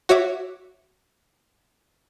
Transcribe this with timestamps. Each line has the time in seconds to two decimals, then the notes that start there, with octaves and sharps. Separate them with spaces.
0.09 F#4 C#5 E5 D6